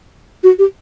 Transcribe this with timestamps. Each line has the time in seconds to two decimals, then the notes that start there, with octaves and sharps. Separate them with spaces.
0.43 F#4
0.59 G4